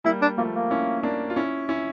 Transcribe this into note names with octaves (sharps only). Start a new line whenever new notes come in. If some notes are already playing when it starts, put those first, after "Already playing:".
G3 A#3 E4
D4
F3 A3 A#3
A#3
C#4 E4
A#3 D4
F4
C#4 E4
C#4 E4